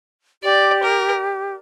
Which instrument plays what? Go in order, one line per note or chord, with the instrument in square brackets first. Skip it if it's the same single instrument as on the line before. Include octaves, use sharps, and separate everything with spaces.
[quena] G4 [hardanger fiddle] D5
[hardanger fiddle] A#4